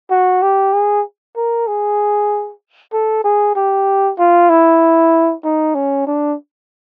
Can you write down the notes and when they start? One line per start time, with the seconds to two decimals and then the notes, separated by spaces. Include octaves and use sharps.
0.10 F#4
0.42 G4
0.74 G#4
1.36 A#4
1.67 G#4
2.93 A4
3.24 G#4
3.56 G4
4.18 F4
4.50 E4
5.44 D#4
5.75 C#4
6.07 D4